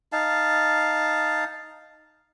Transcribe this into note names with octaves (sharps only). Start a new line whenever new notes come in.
D#4 F5 A5